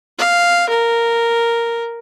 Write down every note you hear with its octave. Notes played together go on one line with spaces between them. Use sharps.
F5
A#4